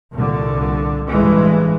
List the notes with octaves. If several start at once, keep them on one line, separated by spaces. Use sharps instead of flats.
C2 A#2 D3
A1 G2 E3 G#3